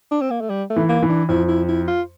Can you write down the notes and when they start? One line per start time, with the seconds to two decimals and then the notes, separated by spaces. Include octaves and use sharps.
0.11 D4
0.21 C4
0.30 A#3
0.41 A3
0.50 G3
0.70 A3
0.76 E3
0.89 A#3
1.02 E3
1.09 D4
1.29 F2 E4
1.48 E4
1.68 E4
1.88 F4